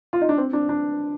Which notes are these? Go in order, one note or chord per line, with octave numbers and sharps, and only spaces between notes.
F4
D#4
D4
C4
D4
D4